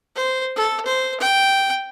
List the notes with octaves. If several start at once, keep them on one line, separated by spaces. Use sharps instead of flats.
C5
A4
C5
G5